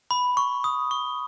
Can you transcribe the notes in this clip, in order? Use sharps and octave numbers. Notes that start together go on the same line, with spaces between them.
B5
C#6
D#6
C#6